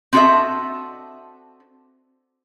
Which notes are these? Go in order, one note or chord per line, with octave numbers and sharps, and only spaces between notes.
C4 D4 F#4 A4 D#5 E5